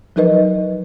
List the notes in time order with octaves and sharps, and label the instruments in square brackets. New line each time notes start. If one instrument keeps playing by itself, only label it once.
[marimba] F3 F#3 D#4 A#4 B4 D#5